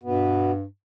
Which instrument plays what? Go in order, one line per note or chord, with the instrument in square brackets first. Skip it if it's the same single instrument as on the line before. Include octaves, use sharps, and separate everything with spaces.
[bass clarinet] G2 [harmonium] B2 B3